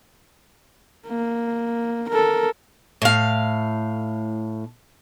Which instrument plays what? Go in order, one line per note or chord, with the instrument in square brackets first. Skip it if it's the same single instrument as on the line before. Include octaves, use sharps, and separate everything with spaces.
[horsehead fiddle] A#3
A4 A#4
[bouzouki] A2 F5